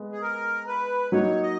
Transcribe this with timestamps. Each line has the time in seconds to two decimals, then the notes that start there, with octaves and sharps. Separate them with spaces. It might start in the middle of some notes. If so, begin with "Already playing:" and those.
Already playing: G#3 B3
0.12 G#4
0.22 A#4
0.67 B4
1.12 F#3 A#3 D#4 C#5
1.43 D#5